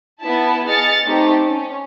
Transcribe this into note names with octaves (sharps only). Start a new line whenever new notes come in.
B3 E4 A5
G#4 D#5 F6 A6 C#7
A3 C4 D#4 G4
C#4